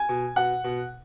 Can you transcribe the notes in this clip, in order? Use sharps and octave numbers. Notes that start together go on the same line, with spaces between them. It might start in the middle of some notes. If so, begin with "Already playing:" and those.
Already playing: G#5
B2
B2 F#5
B2